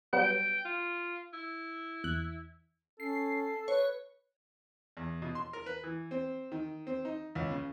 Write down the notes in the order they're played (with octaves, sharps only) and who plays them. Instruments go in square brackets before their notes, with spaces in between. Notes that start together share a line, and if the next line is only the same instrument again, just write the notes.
[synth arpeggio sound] F#3 G3 B3 [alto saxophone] G5
[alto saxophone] F4
E4
[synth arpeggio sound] E2 F#6
[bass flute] C#4 [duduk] A4 [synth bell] C7
[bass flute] B4 [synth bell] C#5
[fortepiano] E2
B2
C6
A#4
B4
E3
C4
D#3
C4
D#4
C#2
C#3